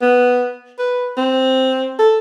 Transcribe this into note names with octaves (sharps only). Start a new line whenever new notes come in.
B3
B4
C4
A4